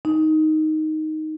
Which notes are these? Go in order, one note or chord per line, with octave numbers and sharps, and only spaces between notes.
D#4